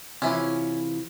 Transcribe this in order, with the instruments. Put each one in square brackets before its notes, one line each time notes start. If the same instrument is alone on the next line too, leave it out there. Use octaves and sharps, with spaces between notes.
[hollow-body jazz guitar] C3 E3 F4 [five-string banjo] C#4 E4